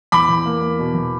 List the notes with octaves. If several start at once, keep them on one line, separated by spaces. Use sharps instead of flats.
E2 B5 D6
E2
A#3
A#3
B2
E2